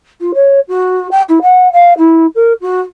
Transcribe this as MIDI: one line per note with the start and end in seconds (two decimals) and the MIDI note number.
0.21 0.32 65
0.35 0.60 73
0.69 1.08 66
1.11 1.22 79
1.29 1.39 64
1.42 1.71 78
1.73 1.93 77
1.98 2.26 64
2.35 2.53 70
2.61 2.81 66